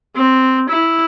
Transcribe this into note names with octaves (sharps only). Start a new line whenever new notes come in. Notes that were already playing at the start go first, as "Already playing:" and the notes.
C4
E4